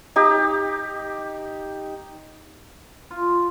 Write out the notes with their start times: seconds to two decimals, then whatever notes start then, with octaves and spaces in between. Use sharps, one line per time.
0.16 D#4 G4
3.11 F4